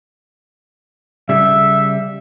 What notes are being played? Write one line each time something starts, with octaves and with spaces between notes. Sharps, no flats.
C#3 G3 E5